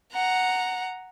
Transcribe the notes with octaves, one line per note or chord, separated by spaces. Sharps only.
F#5 A#5